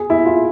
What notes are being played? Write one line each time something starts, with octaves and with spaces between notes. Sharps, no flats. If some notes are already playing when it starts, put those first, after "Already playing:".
Already playing: G#4
E4
F4